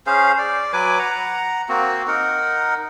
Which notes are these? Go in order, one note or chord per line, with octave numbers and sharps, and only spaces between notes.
C#4 G#4 C5 F5
D5
F#3 B4 G#5 D6
F#5 A#5
A#3 C4 F#4
D#4 A#4 F#5